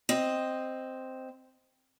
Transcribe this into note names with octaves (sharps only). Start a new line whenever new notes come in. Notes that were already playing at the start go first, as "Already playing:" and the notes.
C4 D#5